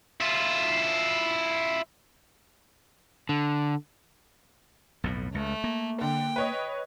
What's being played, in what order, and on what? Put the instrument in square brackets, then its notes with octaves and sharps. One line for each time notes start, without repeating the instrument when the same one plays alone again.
[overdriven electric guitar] E4 F4
[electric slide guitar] D3
[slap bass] B1 F2 A2
[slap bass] C#2 [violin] A3
[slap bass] A#3
[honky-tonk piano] D3 [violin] G5
[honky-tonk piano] B4 C#5 D#5